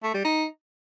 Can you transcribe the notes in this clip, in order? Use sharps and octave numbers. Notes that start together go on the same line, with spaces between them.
A3
G3
D#4